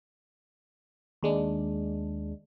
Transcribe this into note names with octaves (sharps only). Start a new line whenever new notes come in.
D#2 G#3 D4